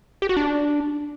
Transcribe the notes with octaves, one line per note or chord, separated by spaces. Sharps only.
G4
F#4
D4